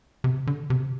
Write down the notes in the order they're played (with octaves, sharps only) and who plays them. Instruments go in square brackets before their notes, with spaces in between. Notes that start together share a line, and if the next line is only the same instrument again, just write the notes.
[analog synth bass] C3
D3
C3